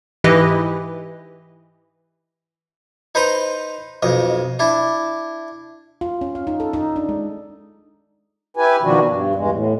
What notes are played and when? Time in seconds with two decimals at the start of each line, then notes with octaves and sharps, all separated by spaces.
0.24 G#2 E3 E4 G4 B4 D#5
3.15 D#4 B4 C5 A#5 C6
4.02 B1 F2 D#5
4.59 D4 E4
6.01 F4
6.21 C#4
6.35 F5
6.47 D#4
6.60 A4
6.73 D#4
6.96 D4
7.09 G#3
8.57 E4 G4 B4 G#5
8.82 B2 D#3 F3 D4 F#4
9.06 G2
9.35 E2 G2 G#3
9.52 A2